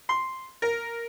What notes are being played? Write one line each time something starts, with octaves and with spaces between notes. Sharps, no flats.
C6
A#4